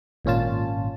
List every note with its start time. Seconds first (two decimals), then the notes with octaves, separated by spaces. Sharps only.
0.25 G#1 A#2 C#4 F4 A5